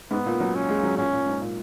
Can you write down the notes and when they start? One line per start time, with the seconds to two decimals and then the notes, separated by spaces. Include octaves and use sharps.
0.11 G#2 B3
0.26 A#2
0.40 F#3
0.55 C#4
0.69 G#3
0.83 F#3
0.97 A#2 C#4
1.12 A#2
1.26 G#2
1.41 A#2